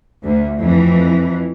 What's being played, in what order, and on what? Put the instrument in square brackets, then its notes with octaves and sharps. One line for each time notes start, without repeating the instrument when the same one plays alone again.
[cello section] D2
F2 E3